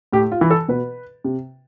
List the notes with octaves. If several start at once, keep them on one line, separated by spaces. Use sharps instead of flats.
A2 G4
F4
E3
A4
B2 B4
C3